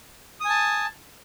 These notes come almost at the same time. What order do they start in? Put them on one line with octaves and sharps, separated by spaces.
D#6 G#5 A5